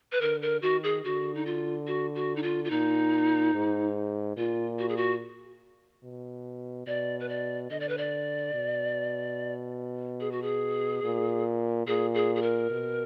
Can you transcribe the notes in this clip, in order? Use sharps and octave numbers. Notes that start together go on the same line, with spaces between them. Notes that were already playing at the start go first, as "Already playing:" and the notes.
B4
D3 A#4
A#4
D#3 F#4
G#4
D3 F#4
D#4
F4
F#4
F#4
D#4
F4
F4
A#2 D#4
G#2
A#2 F4
F#4
G#4
F#4
B2
B2 D5
B4
D5
D3 D#5
D5
B4
D5
B2
G#4
F#4
G#4
A#2
A#2 G#4
G#4
G#4
A#4
B2